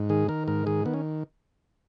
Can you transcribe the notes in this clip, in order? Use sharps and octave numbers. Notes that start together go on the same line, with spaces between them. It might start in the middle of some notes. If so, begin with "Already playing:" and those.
Already playing: G#2
D#3 G#4
D#3 A#4
G#2 A#4
D#3 G#4
D#3 B3
C#4